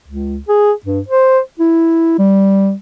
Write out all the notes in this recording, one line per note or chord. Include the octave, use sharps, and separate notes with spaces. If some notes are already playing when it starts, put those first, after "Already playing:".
C#2
G#4
G2
C5
E4
G3